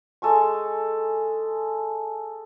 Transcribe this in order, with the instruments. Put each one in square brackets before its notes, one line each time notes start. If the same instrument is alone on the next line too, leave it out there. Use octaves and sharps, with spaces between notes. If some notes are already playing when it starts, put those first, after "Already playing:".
[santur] G#3 A4 G#5 C#6